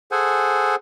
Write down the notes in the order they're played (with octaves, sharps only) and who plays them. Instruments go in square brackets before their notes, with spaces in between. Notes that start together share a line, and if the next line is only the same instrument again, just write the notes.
[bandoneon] G#4 A4 C5 F#5 G#5